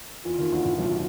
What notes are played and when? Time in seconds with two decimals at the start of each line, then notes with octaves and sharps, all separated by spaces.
0.25 E2 E3 F4
0.38 D#2 D#3
0.52 D2 D3
0.65 A2
0.78 B1 B2